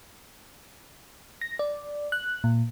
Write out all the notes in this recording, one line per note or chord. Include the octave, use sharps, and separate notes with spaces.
A#6
D5
F#6
A#2